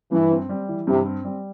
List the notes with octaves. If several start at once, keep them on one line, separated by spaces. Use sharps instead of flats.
G2 E3
C4
G3
E3
G2 C3
C4
G3